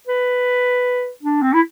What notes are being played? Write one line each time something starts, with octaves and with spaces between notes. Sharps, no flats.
B4
D4
C4
E4